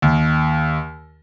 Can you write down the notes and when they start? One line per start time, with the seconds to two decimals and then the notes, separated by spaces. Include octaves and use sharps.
0.02 D#2